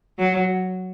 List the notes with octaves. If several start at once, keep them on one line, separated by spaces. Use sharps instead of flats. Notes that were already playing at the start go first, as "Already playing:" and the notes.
F#3